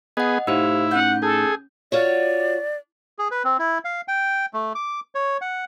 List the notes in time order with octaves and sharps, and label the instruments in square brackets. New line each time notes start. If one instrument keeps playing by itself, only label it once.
[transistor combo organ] B3 G#4 [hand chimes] D#5 F#5
[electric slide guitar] A2 D#4 C#5 [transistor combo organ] E4 [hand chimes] G4 C5 F5
[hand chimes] C#4 G6 [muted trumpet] F#5
[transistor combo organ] G#4 [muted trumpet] A4
[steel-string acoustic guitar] F4 F#4 C#5 [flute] D5
[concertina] G#4
B4
C4
E4
F5
G5
A3
D6
C#5
F#5